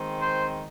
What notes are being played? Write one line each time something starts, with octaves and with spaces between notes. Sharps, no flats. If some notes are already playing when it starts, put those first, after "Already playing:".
Already playing: D#3 G#3 C4
C5